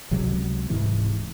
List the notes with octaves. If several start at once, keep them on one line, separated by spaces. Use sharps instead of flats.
C#2 C3 F#3 G#3
D1 G#2 C3 E3